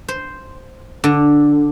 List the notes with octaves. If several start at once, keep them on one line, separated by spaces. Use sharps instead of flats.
C5
D3